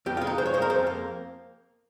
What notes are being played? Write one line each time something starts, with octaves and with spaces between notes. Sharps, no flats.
F2 G4
F4
G#3
D#4
G2 C5
C#5
G#3 C5
A#4
F2 C5
A#3